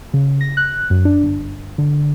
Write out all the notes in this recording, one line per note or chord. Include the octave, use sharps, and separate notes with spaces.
C#3
A#6
F#6
F#2
D4
G1
D3